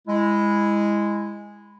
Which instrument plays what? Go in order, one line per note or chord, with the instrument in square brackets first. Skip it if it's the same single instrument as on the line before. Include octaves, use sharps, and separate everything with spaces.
[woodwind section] G#3 E4